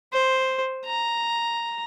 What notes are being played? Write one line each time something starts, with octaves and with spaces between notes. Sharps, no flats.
C5
A#5